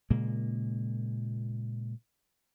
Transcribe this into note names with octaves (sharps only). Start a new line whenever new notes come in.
A#2 C#3 G#3 A#3